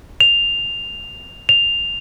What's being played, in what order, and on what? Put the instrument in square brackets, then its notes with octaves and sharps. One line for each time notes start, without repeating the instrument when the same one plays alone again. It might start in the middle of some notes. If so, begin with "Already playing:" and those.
[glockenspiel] F7
F7